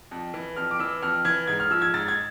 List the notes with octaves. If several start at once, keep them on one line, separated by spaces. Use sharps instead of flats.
F2
E3
F2 F6
D6
E3 E6
F2 F6
E3 G#6
G#2 G#6
F6
F3 E6
G#6
G#2 A6
G#6